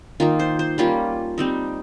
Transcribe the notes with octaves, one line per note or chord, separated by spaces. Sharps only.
D#3 A#3 D#4 F4
C5
C5
G3 A#3 C#4 F4
G3 C4 D#4